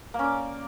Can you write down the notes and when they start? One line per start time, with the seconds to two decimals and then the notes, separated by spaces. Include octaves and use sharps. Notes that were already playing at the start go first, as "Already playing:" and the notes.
0.14 A#3
0.19 C#4
0.24 D5